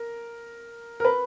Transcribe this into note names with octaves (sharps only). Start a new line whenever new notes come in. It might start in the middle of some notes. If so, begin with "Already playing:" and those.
Already playing: A#4
A#4
B4